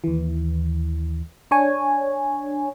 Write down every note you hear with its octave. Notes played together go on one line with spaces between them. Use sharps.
D#2 E3
D4 C#5 G#5